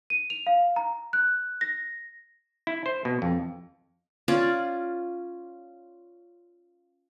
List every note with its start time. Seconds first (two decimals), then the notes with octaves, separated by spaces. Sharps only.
0.10 D#7
0.30 F7
0.47 F5
0.76 A#5
1.13 F#6
1.61 A#6
2.67 E4
2.86 C5
3.05 B2
3.22 F2
4.28 C#4 F4 D5